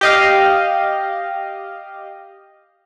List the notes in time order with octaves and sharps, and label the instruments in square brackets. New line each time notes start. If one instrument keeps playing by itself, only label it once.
[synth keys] G4 D#5 F5